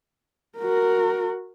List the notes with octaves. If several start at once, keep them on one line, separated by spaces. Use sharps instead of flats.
F#4 A#4